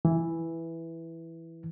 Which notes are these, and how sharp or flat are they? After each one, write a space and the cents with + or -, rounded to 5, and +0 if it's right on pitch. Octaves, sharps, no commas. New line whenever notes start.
E3 +0